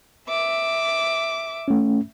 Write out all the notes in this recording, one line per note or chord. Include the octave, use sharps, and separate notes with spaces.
E5 D6
A3 C#4